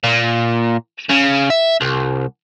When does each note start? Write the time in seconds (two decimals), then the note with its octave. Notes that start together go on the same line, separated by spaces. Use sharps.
0.04 A#2
1.09 C#3
1.50 E5
1.81 C2